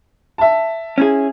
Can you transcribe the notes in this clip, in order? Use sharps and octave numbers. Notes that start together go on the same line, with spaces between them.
E5 A5
C#4 E4 G#4